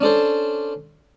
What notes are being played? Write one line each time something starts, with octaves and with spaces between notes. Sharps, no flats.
C#4 D4 A4 C5